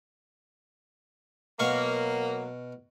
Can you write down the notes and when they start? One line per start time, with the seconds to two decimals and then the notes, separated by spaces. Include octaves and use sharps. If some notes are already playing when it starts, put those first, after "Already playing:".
1.59 B2 F#3 A#3 F5 C#6